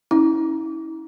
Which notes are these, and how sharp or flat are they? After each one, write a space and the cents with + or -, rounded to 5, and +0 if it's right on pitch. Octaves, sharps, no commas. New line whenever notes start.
C#4 +0 E4 -35